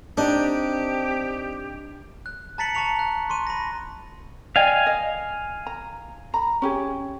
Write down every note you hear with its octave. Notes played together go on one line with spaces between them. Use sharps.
C4 D4 D#4 G4
F#6
A5 A#5 A6 B6 C#7 F#7
A5 A#5 C#6 C#7 F7
F#6
C6 C#6 D#7
B5 A#6
D5 D#5 F5 G5 G#5
D#5
A#5
A#5 B5
C#4 G4 G#4